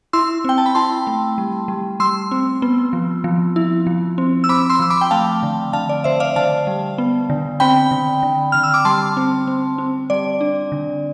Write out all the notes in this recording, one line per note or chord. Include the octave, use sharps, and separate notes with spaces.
E4 C6 E6
C4 G5
A5
B5
E4 A5 C6
A3
G3
G3
G3 C6 E6
C4
B3
F3
F3
E4
F3
C4
E6
C4 B5 D6
C6 E6
F3 E6
B5 D6
G5
A3 F5 A5
D3
D3 F5 A5
D5
D3 C5 E5
D5 F5
D3 F5 A5
G3
B3
D3
C4 G5 B5
D3
D3
D3 F6
E6
D6
G3 A5 C6
C4
C4
C4
G3 D5
D4
D3